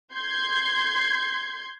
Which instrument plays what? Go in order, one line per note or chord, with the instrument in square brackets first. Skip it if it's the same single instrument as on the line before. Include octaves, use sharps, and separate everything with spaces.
[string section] C6 G6 G#6 C7